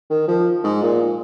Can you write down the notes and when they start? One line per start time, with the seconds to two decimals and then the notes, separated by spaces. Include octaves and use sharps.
0.10 D#3
0.28 F3
0.64 G#2
0.83 A#2